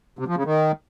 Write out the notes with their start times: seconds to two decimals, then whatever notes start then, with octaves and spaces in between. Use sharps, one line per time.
0.19 C3
0.28 F3
0.37 C#3
0.45 D#3